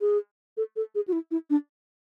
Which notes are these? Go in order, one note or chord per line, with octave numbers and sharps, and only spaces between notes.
G#4
A4
A4
G#4
F#4
E4
E4
D4